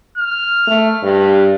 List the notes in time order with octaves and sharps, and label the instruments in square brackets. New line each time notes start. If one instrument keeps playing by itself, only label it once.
[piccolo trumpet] F6
[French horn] A3
G2